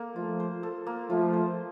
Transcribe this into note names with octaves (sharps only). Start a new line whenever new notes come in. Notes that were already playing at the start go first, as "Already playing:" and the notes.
Already playing: A#3 A4
F3 A3 F4
C5
A4
A#3
F3 A3 F4
C5